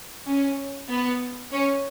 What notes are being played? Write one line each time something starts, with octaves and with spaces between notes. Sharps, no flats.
C#4
B3
C#4